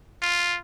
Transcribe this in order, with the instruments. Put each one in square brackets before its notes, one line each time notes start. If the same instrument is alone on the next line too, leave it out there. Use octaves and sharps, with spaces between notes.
[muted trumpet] F4